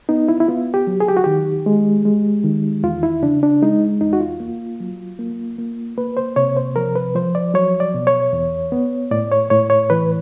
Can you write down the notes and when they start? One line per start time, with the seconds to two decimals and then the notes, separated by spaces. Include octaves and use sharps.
0.09 B3 D#4
0.28 E4
0.40 E4
0.48 B3 F4
0.74 G4
0.87 F#3
1.00 G#4
1.09 G4
1.17 F#4
1.24 D#3 G4
1.66 G#3
2.05 G#3
2.44 D#3
2.83 E2 F4
3.03 E4
3.23 C#3 D4
3.43 D4
3.62 G#3 D#4
4.01 E2 D#4
4.13 F#4
4.20 F4
4.40 A#3
4.80 F#3
5.19 A#3
5.59 A#3
5.97 A#3 B4
6.17 C5
6.36 C3 C#5
6.57 C5
6.76 F3 A#4
6.96 B4
7.15 F3 C5
7.35 D5
7.54 F#3 C#5
7.80 D5
7.94 B2
8.07 C#5
8.33 E2
8.72 B3
9.11 A2 D5
9.32 C#5
9.50 A2 C#5
9.70 C#5
9.90 E3 B4